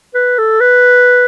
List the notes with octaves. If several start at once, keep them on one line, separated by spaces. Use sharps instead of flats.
B4
A4
B4